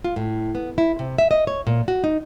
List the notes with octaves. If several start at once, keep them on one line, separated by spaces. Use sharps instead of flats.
F4
A2
B3
E4
C3
E5
D#5
C#5
A#2
F#4
D#4